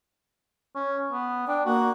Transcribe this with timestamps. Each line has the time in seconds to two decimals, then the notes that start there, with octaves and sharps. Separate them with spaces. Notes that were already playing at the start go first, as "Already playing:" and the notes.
0.75 C#4
1.12 B3
1.48 D4 G5
1.65 A#3 F#4